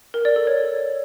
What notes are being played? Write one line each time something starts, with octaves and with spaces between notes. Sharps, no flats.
A#4
D5
A4
C#5